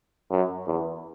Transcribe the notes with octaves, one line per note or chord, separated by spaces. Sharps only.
F#2
E2